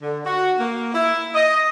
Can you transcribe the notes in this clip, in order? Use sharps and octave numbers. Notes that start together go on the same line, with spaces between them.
D3
F#4
A#3
E4
D#5